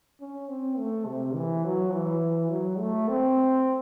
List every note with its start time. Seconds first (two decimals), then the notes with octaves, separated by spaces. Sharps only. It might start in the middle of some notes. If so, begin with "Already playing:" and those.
0.21 C#4
0.49 C4
0.78 A3
1.06 C3
1.35 E3
1.65 F#3
1.93 E3
2.50 F#3
2.79 A3
3.08 C4